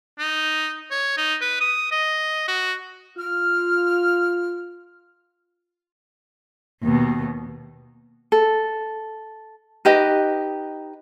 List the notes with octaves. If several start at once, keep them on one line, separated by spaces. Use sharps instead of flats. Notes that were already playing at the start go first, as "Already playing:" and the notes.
D#4
C#5
D#4
B4
D#6
D#5
F#4
F4 F6
D#2 B2
A4
D#4 G4 B4 D#5